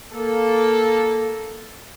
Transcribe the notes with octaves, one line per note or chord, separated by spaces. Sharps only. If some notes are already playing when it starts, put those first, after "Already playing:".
A#3 A4